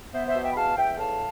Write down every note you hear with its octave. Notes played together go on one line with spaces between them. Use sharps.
B3 C5 E5
C5 E5
B2
E5 G5
B5
E2 F5 A5
E2 E5 G5
A2 F5 A5